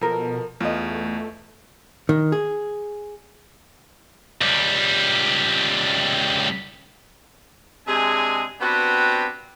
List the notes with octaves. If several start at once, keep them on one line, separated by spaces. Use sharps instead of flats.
B2 F3 A4 A#4
E2 A3 F4 D#5
D#3
G#4
C#2 G3
C3 G#3 D4 G#4 G#5
B3 C4 D4 F#4 G4 B4